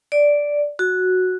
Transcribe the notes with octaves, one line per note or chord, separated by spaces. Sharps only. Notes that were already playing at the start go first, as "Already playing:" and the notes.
D5
F#4